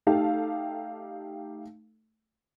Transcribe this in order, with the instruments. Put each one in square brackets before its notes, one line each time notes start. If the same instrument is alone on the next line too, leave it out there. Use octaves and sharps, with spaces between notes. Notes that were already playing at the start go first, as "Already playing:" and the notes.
[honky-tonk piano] A3 D#4 G4 A4 F5